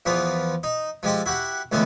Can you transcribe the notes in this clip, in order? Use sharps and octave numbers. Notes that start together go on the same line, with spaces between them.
E2 E3 F3 B3 F4
D#4
F3 G#3 G4 A4
E4 F#4 G4 F#5
C#2 A2 D3 E3 A3 B3